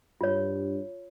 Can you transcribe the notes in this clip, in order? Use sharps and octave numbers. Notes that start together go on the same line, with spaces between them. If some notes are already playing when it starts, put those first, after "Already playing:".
G2 F4 C#5